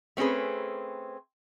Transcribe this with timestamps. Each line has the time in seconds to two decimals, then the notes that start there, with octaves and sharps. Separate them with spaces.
0.17 A3 C4 C#4 G#4 B4